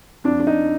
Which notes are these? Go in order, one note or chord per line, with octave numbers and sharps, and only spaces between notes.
F2 D4
D4
D#4